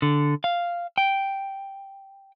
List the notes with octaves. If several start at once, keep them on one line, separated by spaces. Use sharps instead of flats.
D3
F5
G5